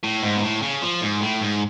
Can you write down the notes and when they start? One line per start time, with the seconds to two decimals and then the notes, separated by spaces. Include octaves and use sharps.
0.03 A2
0.23 G#2
0.37 B2
0.43 A2
0.63 C#3
0.83 F3
1.02 G#2
1.21 A2
1.42 G#2